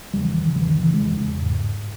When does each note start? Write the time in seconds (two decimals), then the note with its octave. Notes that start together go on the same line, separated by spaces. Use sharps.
0.14 E2 C#3 G3
0.24 E3
0.35 E3
0.45 E2 C#3 E3
0.56 E3
0.67 D#3
0.77 E2 C#3 E3
0.94 G#3
1.09 E2 C#3
1.42 G#2